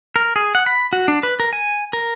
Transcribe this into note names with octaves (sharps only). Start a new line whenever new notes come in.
A#4
G#4
F#5
B5
F#4
D4
B4
A#4
G#5
A#4